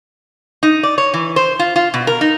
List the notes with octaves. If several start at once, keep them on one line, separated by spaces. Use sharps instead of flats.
D#4
D5
C#5
E3
C5
F4
F4
B2
A#4
D#4